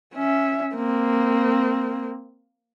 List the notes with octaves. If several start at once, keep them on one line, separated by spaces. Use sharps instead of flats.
C#4 E5
A#3 C4